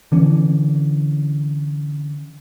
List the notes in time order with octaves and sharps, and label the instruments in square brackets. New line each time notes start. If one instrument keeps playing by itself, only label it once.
[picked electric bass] D3 E3 C#4